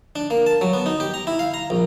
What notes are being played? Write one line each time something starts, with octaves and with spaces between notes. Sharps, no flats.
D4
A#3
A5
F#3
B3
D#4
G4
A#5
E4
F5
A#5
A#1